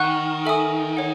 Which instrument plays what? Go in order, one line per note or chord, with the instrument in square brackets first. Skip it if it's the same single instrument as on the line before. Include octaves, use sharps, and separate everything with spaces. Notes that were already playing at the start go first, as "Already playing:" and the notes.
Already playing: [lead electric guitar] D#3 [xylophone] F#5 C#6 F#6
[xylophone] A4 E5 G#5 D#6
C#5 F#5